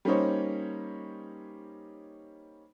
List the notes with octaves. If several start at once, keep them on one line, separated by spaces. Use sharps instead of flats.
G3 A#3 C#4 D#4 C5 C#5